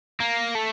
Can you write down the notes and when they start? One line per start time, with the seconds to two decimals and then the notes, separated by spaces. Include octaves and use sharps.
0.20 A#3
0.55 A3